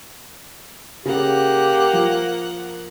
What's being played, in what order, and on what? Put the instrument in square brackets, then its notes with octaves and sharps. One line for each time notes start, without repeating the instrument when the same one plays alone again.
[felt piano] C#3 [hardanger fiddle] A#3 F#5 [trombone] G4
[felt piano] F3